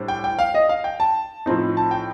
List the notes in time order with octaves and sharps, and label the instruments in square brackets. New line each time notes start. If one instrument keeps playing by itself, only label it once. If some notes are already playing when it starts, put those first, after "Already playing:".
Already playing: [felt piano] A2 G3 D4 C5
[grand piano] G5
G5
F5
D#5
F5
G5
A5
[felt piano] A2 F3 C4 D#4
[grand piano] A5
G5